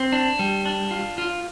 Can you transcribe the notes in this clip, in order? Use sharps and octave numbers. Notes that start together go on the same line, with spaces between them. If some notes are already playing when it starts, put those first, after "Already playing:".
Already playing: C4
D4
G3
D4
F4
F4